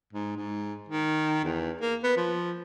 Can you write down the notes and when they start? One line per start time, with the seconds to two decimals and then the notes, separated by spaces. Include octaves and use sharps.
0.13 G#2
0.36 G#2
0.89 D#3
1.44 E2
1.81 A#3
2.03 B3
2.17 F3